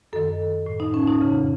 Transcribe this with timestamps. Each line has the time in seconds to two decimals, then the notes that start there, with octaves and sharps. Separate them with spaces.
0.13 F#2 D#3 A4
0.66 A2
0.80 D#4
0.94 C#4
1.07 D#4
1.21 F2 C#3